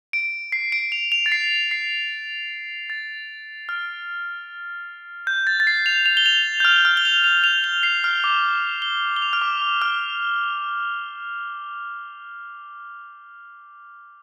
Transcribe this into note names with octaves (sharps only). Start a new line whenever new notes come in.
D7
C7
D7
F7
F7
A6
C7
C7
A6
F6
G6
A6
A6
C7
F7
F7
G7
F7
G6
F6
F6
G7
F7
F7
F7
G7
C7
F6
D6
G7
G7
F7
F6
D6
D6
F6